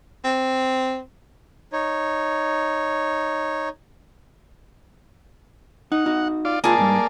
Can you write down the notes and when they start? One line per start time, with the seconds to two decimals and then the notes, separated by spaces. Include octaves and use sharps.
0.25 C4
1.73 D#4 C#5
5.92 D#4 F#5
6.06 D#4 F#4
6.45 F4 D5
6.64 C#2 A#3 F4 G#4 D5 A5 B5
6.78 G#2 G3